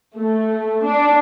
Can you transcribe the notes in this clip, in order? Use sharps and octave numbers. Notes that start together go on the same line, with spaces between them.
A3
D4